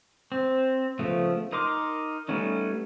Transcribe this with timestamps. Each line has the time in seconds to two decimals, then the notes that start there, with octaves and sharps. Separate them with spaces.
0.32 C4
0.99 C#3 F3 A3 B3
1.52 D#4 A#4 C6 D6
2.28 G3 A3 B3 C#4 D#4